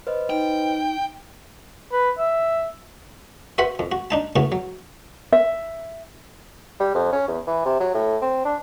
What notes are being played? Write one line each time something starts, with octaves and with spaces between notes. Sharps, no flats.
B4 C5 D#5
D#4 G5
B4
E5
F#4 B4 C5 E5 F#5 B5
F2
F#4
D4 D#4 A5
A2 C#3 B3 F#4
F#3
E5
G3
F2
C#4
E2
E3
C3
F#3
A2
C4
D4